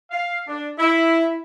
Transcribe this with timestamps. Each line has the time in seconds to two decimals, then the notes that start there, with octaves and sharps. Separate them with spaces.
0.11 F5
0.47 D4
0.79 E4